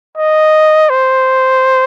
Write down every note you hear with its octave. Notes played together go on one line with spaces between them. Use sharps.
D#5
C5